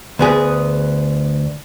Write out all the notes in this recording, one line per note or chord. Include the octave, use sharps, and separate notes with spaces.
D2 B3 G#4